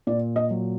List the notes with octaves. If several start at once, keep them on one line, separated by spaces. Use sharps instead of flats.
A#2 D5
D#5
F#3